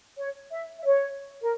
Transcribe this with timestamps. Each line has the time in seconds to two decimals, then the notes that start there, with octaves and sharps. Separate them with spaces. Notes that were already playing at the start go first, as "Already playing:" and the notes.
0.18 C#5
0.51 E5
0.79 E5
0.85 C#5
1.42 A#4